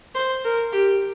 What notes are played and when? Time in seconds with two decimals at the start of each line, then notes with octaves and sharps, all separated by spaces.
0.15 C5
0.44 A#4
0.72 G4